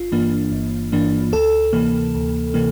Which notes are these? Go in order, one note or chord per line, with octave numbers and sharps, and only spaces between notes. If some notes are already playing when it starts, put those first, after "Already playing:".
Already playing: G1 F4
G2 E3 A#3 D4
G1
G2 E3 A#3 D4
D2 A4
C3 E3 A#3
D2
C3 E3 A#3